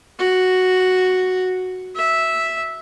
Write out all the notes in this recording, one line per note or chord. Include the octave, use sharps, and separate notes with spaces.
F#4
E5